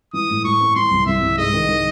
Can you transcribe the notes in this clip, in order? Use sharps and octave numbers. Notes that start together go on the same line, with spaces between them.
E3 D#6
A2
A2 C#6
C4
E3 C6
C2
C2 E5
C2
G#2 D#5
D#3
D#3